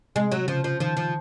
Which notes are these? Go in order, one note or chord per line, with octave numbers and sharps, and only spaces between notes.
C3 G#3
F#3
C#3 F3
F3
D#3 F3
F3